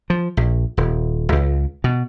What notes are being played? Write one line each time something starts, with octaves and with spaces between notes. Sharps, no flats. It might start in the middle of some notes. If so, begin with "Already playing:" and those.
F3
A#1
D#1
C#2
B2